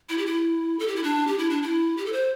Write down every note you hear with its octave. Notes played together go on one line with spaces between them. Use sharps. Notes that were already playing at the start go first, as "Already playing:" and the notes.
E4
G4
E4
A4
G4
E4
D4
G4
E4
D4
E4
G4
A4
C5